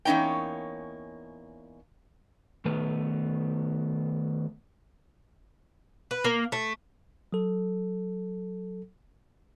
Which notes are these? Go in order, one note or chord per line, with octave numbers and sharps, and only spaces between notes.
E2 A#3 C#4 D#4 C#5 G5
D#3 A3 B3 B4
B4
A#3
A3
F#3 A4